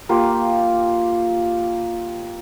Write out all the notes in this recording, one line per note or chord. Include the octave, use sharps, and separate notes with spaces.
A#3 F4 G4